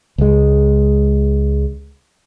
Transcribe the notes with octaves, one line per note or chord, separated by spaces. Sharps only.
C#2 G#3